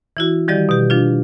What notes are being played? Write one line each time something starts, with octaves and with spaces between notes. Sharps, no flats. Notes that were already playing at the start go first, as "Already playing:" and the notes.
E3 E4 F#4
D#3 F3 G3 G4 D5 D#5
B2 G4
F3 D4 F4